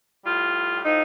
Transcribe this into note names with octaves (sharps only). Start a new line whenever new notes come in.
A2 G3 F4
A2 F3 D#4